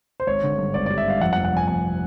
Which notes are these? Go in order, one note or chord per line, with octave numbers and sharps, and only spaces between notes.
C5
G#1 C#5
D3
G2
G#1 D5
G3 D5
E5
G2 F5
F2 F#5
F#5
F1
F#5
F1 G#5
F1 G#5